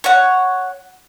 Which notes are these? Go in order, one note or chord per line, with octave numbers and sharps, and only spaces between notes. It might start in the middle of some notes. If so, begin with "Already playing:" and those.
C#5 F#5